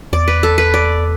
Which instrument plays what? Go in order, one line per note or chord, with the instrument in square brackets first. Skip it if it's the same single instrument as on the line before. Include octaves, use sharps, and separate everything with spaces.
[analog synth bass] E2 [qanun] D5
[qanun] B4
A4
B4
D5